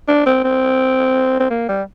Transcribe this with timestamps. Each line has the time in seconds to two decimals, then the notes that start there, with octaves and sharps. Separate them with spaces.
0.08 D4
0.26 C4
0.44 C4
1.40 C4
1.50 A#3
1.69 G3